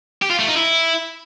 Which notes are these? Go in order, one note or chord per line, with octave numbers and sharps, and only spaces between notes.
G4
F4
A3
D#4
E4